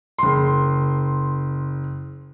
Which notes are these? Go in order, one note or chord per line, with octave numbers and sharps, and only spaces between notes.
F#1 C6